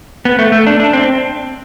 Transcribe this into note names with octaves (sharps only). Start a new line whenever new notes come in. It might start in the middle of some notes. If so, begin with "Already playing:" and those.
B3
A3
A3
D4
D4
C4